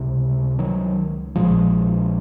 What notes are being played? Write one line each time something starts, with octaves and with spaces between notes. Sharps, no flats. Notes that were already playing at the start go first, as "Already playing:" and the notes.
Already playing: C#2 C3
D#3 F#3
A#1 A#2 F3 G#3